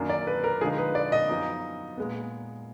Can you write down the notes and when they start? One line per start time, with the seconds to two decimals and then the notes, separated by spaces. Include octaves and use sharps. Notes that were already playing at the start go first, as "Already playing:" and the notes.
Already playing: F#2 D#3 A#3 D4
0.09 D5
0.27 B4
0.44 A#4
0.61 D3 F3 G#3 D#4 G#4
0.78 B4
0.95 D5
1.12 D#5
1.29 F#2 F3 B3 D#4
1.97 A#2 G#3 B3